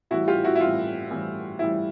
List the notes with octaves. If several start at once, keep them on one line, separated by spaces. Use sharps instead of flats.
A2 E3 G3 E4 F#4
F4 G4
E4 F#4
E4
A2 E3 G3 F4
A2 E3 G3
A2 E3 G3 E4